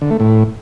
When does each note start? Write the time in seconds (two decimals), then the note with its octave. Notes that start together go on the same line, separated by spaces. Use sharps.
0.01 D3
0.11 A3
0.20 A2